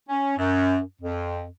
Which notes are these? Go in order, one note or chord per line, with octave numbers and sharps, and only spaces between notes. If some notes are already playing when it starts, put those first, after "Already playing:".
C#4
F#2
F2